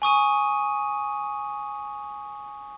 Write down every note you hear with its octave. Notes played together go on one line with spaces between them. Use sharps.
G#5 C#6 D#6 D#7